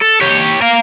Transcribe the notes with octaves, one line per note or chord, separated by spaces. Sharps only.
A4
G4 C#5
A#4 F5